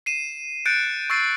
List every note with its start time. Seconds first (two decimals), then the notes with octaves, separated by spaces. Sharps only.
0.06 C7 D#7 E7
0.66 F#6 G6 A6 C#7 D7
1.10 C#6 E6 A6 C7